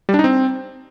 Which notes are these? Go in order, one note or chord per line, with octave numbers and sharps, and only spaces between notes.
G3
D4
D#4
C4